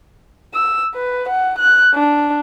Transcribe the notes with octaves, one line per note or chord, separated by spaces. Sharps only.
E6
B4
F#5
F#6
D4